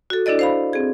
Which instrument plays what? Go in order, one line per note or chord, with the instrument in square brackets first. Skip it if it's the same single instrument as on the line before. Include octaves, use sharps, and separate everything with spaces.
[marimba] F#4 A4
D4 E4 A4 D5 D#5
C5 F5 B5
C4 G#4